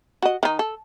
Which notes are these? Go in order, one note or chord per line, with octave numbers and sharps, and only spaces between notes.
F#4 D#5
D#3 D#4
A4